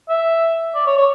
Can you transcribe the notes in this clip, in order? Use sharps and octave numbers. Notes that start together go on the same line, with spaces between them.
E5
D5
C#5
C#5